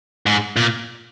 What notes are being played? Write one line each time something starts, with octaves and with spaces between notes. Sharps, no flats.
G#2
A#2